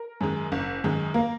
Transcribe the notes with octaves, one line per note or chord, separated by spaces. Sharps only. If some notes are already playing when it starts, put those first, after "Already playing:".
Already playing: A#4
F#2 D#3 G#3
F#1
F#2 D#3 G#3
A#3 A#4